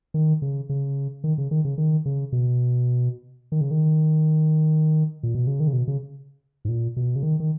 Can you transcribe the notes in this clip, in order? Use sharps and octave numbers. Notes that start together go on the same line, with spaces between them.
D#3
C#3
C#3
D#3
C#3
D#3
C#3
D#3
C#3
B2
D#3
C#3
D#3
A#2
B2
C#3
D#3
C#3
B2
C#3
G#2
A#2
B2
C#3
D#3
D#3